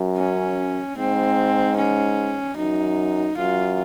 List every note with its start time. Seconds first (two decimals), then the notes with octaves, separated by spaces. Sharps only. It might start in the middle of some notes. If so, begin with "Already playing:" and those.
Already playing: F#2
0.17 C#4
0.97 G#2 C4
1.77 C#4
2.56 F#2 D#4
3.36 F#2 F4